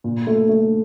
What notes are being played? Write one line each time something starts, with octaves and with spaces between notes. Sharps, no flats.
A#2
A3
A3